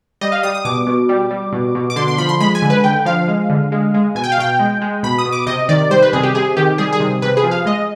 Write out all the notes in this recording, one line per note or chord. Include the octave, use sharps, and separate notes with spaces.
G3 D#5
F5
G3 D#6
D#6
B2 D6
B2
G3
G3
B2
B2
D6
D3 C6
C6
F3 B5
C6
G#3 B5
G#5
D3
B4
D3 G5
F3 F5
G#3
D3
G#3
G#3
B2 G#5
G5
F5
B2 G5
G#3
G#3
B2 B5
D#6
B2
D6
C3 D#5
D#3 D5
G3 C5
B4
C3 G#4
G4
C3 G#4
D#3 G4
G3 G#4
G#4
C3
C3 B4
G#4
F3
F5
G#3 D#5